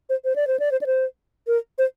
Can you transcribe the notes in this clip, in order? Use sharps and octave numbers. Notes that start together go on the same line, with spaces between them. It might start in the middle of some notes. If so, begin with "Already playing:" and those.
C5
C5
D5
C5
D5
C5
D5
C5
A#4
C5